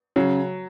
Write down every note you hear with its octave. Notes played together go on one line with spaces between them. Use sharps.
C#3 F#3